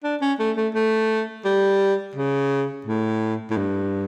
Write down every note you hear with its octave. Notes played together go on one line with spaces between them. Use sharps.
D4
C#4
A3
A3
A3
G3
C#3
A2
A2
G2